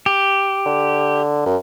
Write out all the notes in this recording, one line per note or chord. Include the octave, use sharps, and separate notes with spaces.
G4
D3
F#2